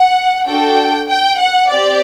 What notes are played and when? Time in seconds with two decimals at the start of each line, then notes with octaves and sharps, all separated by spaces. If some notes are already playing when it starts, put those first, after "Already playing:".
Already playing: F#5
0.46 D4 F#4 A4 G5
1.08 G5
1.39 F#5
1.69 C4 G4 D5